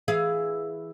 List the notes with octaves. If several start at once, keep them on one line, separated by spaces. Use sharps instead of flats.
E3 G#4 F5